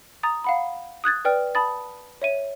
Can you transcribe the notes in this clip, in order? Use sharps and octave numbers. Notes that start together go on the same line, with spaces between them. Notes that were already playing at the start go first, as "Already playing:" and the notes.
A#5 D#6 A6
F5 F#5 B5
D#6 F#6 G#6 A6
B4 D5 G5 F6
A5 B5 D#6 A6
C#5 E5 D#7